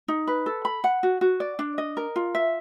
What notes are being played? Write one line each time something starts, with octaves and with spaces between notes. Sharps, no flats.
D#4
B4
A4
B5
F#5
F#4
F#4
D5
D4
D#5
A#4
F4
E5